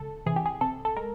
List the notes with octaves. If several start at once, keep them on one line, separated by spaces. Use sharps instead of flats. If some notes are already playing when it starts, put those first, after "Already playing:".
Already playing: C#2 A4
C3 E3 G#4
G4
G#4
C3 A4
A4
G#3 A#4